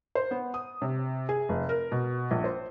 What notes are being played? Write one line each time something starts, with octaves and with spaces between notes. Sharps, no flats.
C5
B3
D#6
C3
G#4
F1
A#4
B2
A#1
C5